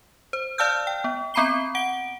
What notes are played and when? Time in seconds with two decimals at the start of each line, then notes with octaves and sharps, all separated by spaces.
0.33 C5
0.58 D5 F5 A5 E6 F6 G6
0.87 G5
1.04 B3
1.34 B3 C4 A#5 B5 C7 G7
1.75 F#5 D7 G7